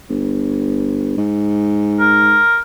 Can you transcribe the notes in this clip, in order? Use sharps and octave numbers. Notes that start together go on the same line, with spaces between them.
G1
G#2
A#4